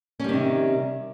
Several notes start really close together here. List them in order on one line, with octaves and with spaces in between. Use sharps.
C#4 G3 D#3 C3